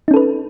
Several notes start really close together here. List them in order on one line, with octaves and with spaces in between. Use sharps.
D#4 C#4 A4 B4